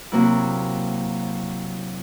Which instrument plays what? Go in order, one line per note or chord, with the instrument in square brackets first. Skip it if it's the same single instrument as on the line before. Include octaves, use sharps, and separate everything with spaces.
[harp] C3 F#3 A#3 C4 E4